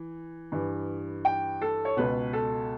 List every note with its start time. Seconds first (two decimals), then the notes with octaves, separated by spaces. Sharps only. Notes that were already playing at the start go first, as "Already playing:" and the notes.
Already playing: E3
0.52 G2 E3
1.25 G5
1.61 A4
1.85 C#5
1.96 C#2 B2 B4
2.33 A4